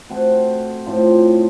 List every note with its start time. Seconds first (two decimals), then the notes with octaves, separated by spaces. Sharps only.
0.10 A3 C4 F#4 C5
0.86 A2 A3 C4 F4